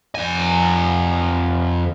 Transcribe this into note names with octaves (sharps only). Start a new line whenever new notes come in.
F2 G#5